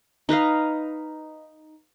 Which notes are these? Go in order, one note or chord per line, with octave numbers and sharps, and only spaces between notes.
D#4 B4 D#5 F5